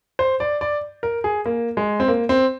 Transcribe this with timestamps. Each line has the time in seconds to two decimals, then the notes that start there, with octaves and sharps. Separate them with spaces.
0.19 C5
0.40 D5
0.61 D5
1.03 A#4
1.24 G#4
1.46 A#3
1.77 G#3
2.00 C4
2.08 A#3
2.29 C4